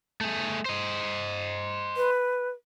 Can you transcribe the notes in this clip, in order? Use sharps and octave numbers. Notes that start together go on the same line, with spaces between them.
A3 G#4
C5 D#5
B4